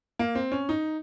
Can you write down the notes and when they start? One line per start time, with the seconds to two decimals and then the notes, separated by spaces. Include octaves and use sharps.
0.19 A#3
0.35 C4
0.52 C#4
0.69 D#4